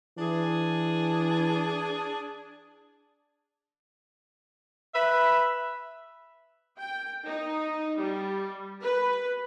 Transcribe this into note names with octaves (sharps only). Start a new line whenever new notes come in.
E3 D4 G#4
B4 E5
G5
D#4
G3
B4